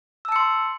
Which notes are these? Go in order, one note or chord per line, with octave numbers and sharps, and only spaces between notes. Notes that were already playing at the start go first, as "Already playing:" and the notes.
A5 C6 E6 C#7